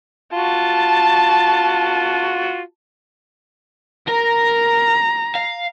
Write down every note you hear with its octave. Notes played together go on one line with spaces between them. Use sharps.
F4 F#4 A5
A#4 A#5
F5